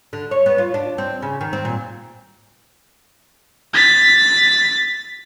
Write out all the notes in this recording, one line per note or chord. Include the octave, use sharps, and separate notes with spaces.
D3
C#5
B3
F4
D4
C4
C#3
D#3
C4
A#2
A6 B6